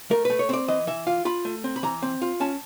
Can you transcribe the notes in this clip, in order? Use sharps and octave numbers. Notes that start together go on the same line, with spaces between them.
A3 A#4
A3 B4
C#5
C4 D5
E3 D#5
E3 E5
F4 F5
F4 B5
A3
C4
B5
E3 A#5
C4
F4
C#4 A5